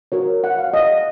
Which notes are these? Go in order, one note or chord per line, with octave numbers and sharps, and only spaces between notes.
F#4 A#4 C#5
F#5
F5
D#5